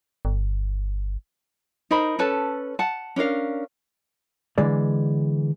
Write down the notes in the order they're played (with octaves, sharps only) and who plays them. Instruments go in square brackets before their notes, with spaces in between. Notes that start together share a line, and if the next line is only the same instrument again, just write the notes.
[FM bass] G1
[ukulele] D#4 A#4 C5 B5
C#4 A4 B4 A5
F#5 A5
C#4 D4 A#4 F5
[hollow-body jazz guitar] D3 E3 G#3 D5